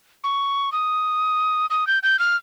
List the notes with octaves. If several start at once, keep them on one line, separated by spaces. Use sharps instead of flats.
C#6
D#6
D#6
G6
G6
F6